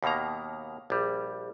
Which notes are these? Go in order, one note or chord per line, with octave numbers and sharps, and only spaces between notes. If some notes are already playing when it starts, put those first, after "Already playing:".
D#2 B2 D#3 A#3 A#5
A#1 G3